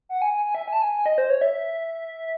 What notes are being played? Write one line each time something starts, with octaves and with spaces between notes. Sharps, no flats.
F#5
G#5
G#5
G#5
E5
G#5
A5
G#5
G#5
D#5
C5
C#5
E5